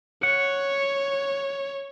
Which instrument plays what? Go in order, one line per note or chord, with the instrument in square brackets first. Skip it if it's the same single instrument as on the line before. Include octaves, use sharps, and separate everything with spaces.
[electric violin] C#5 [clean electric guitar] F#5